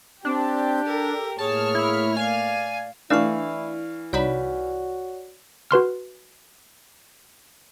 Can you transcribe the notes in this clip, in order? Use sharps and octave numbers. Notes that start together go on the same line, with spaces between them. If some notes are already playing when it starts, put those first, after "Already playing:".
C4 D4 G4
A4 A#4
A2 A#3 G#4 C#5 A5 F6
E4
D5 F5 G#5
E3 A3 D4 E4 D5 F5 C#6
C2 D#4 F#4 C#5 D5 B5
F#4 B4 C6 F6